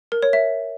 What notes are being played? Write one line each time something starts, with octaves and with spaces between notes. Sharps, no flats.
A#4
C#5
E5